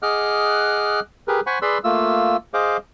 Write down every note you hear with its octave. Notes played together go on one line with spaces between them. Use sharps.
G#4 D#5 F#5 D6 F6 F#6
G4 G#4 A#4 B4
C5 F#5 G#5 B5 C#6
G#4 B4 D5 B5 C6 E6
A3 A#3 F4 E6
G#4 C5 D#5 F5 D6